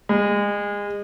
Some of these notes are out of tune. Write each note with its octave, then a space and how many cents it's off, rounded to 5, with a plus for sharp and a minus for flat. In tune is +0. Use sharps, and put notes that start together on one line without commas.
G#3 -30